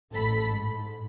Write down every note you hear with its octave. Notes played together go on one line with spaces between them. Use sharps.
A1 A4 B5
G#2